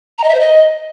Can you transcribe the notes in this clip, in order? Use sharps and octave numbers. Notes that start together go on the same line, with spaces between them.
A#5
D#5
E5
C5
D#5